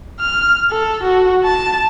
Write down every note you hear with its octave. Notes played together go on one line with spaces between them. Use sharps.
F6
A4
F#4
A5